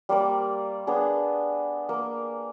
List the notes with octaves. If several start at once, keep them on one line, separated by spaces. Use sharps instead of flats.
G3 A#3 C5 D5
B3 D4 G#4
A#3